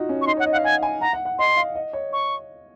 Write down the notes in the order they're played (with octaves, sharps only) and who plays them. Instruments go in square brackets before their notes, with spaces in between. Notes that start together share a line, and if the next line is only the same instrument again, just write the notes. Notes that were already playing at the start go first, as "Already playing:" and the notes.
Already playing: [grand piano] D#4 F4 F#4
C#4
[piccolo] C#6
[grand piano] D#4 [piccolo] C6
[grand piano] C#5 [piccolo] F#5
[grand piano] D#5
[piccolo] F#5
[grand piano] F5
[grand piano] F#5 [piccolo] G#5
[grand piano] G#5
[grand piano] F#5 [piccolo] A#5
[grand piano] F#5
F#5
[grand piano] D#5 [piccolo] C6
[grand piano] F5
D#5
C#5
[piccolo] C#6